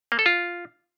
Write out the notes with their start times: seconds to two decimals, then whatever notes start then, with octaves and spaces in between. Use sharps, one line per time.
0.12 A#3
0.19 A4
0.26 F4